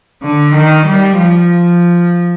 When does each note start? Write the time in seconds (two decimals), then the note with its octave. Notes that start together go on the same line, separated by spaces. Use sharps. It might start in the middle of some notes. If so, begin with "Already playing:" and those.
0.22 D3
0.54 D#3
0.86 G3
1.18 F3